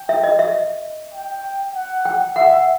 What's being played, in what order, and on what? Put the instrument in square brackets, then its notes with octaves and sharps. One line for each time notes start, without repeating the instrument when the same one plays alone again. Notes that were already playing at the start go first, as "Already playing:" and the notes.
Already playing: [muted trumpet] G5
[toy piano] E5
D#5
E5
[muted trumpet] G5
F#5
[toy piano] G5
[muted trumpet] E5 [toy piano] F#5